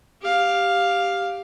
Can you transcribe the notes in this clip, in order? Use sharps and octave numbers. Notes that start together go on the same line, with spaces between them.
G4 F5